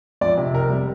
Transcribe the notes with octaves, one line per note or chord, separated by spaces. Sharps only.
F2 D5
C3
F1 A#4
G3